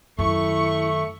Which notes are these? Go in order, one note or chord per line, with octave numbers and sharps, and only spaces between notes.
F#2 D#3 A3 E4 C#6